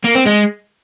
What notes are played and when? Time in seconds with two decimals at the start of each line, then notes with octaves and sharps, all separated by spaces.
0.04 A#3
0.15 C4
0.25 G#3